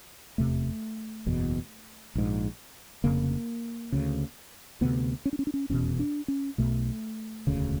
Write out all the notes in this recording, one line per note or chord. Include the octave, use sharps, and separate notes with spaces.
F1 E2 C3 A3
F#1 E2 B2
A#1 G#2
F1 F2 C#3 A#3
D2 C#3
D2 C3 B3
C#4
D4
C#4
D4
C#4
F1 E2 B2 C#4
D4
C#4
B1 B2 A3
E1 D2 C#3